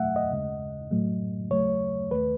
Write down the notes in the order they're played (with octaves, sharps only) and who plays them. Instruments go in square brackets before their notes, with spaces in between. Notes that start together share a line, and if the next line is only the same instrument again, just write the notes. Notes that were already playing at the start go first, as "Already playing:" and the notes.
Already playing: [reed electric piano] E2 B2 F#3 A3 E5 F#5
D#5
D#2 C#3 G#3
A2 F#3 A3
D#2 C#3 F#3 A3 C#5
D#2 D#3 A3 B4